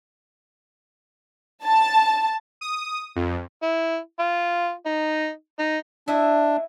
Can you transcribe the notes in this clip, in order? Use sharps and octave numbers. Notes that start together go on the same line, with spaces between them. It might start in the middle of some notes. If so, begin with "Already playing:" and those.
A5
D#6
F2
E4
F4
D#4
D#4
D4 E4 D#5 E5